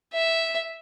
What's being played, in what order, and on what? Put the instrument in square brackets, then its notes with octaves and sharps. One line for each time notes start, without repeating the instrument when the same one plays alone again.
[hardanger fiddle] E5